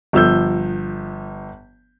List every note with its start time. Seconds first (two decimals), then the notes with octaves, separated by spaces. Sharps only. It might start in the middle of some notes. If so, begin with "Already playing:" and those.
0.13 G1 F3 E6 G6